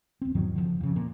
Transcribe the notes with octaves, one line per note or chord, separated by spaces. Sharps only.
D#1 C4
E2 G#2 D#3 F#3
F#1 B1 D3 F3
F2 C#3
A#2